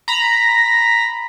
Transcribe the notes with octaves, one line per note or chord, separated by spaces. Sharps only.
A#5 B5